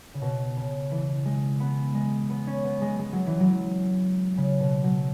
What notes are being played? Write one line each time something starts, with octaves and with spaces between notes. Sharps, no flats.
C#3
B2
C#3
E3
G#3
B3
G#3
B3
C#4
B3
G#3
G#3
F#3
E3
F#3
C#3
B2
F#3